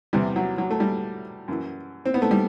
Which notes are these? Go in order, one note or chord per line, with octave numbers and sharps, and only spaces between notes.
E2 C3 E3 G3
F#3
F#3
A3
G3
F#2 E3
C4
B3
A3
G3